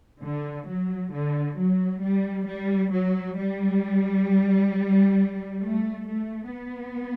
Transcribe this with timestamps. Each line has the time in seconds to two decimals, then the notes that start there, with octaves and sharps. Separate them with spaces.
0.22 D3
0.68 F#3
1.13 D3
1.58 F#3
2.02 G3
2.47 G3
2.92 F#3
3.37 G3
5.63 A3
6.07 A3
6.52 B3